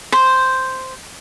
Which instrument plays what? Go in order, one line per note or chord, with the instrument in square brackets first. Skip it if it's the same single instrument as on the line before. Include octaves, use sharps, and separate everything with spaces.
[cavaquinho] C5